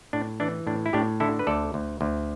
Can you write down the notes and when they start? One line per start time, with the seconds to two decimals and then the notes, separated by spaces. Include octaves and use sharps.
0.13 A2 D4
0.40 E3 D4
0.67 A2 D4
0.86 E4
0.93 A2 D4 G4
1.20 D3 E4 A4
1.39 B4
1.47 D2 A4 D5
1.74 D2
2.01 D2